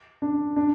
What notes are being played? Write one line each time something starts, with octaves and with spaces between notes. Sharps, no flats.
D4
D4